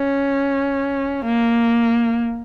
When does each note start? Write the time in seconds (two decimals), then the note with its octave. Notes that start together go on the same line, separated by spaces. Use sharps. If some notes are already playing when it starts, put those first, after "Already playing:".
Already playing: C#4
1.25 A#3